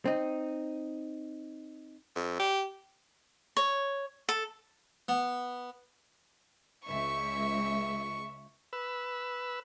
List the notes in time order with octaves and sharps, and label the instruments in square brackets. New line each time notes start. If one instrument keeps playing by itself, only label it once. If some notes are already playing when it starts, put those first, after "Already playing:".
[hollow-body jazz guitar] C4 D#4
[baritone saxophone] F2
G4
[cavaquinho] C#5
A4
[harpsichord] B3
[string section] C#2 E5 [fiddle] C#6
[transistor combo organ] B4 E6